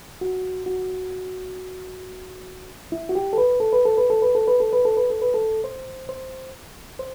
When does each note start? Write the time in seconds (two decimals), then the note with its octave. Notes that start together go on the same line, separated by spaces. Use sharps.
0.21 F#4
0.66 F#4
2.92 E4
3.09 F#4
3.15 G4
3.33 A4
3.38 B4
3.60 A4
3.73 B4
3.85 A4
3.98 B4
4.10 A4
4.22 B4
4.35 A4
4.48 B4
4.60 A4
4.73 B4
4.85 A4
4.97 B4
5.10 A4
5.22 B4
5.34 A4
5.64 C5
6.09 C5
6.99 C5